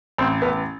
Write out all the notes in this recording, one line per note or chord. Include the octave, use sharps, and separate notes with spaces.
A1 C4
A1 B3